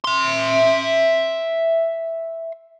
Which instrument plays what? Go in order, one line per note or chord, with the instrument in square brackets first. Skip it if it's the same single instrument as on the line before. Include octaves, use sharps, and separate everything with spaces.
[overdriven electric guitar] E5 C6